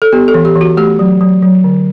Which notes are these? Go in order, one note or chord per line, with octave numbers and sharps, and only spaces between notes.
A4
B3 G4
A4
E3
G4
E3
F#4
A3 G4
F#3
F#3
F#3
D3